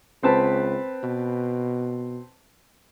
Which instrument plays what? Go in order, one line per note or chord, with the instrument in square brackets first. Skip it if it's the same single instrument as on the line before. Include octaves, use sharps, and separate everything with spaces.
[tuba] C#2 [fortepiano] C4 B4 A5
[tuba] B2